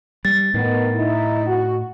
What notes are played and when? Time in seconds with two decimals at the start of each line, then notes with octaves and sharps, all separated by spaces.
0.25 G3 A6
0.54 A2 D#3 B3
0.96 D#4 E4
1.47 F#4